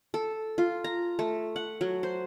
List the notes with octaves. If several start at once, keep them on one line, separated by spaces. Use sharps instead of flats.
A4
F4
A#5
A3
F#5
F#3
C5